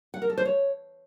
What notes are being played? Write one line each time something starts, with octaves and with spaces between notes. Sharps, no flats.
F#5
A#4
A4
C5
C#5